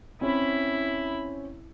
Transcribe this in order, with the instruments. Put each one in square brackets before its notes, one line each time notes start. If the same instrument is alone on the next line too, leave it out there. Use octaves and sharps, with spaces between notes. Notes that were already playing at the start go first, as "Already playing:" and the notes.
[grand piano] C4 C#4 [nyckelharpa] E4 B5